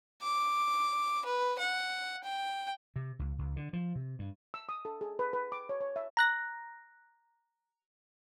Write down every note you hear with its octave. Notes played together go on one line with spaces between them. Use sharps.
D6
B4
F#5
G5
C3
C#2
C#2
D3
F3
C3
G2
E6
D#6
A4
G#4
B4
B4
D6
C#5
C#5
E5
A#5 F#6 A#6